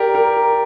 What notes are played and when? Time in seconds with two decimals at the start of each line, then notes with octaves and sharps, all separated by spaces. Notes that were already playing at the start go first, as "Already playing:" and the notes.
Already playing: G4 A#4 D5
0.15 A#4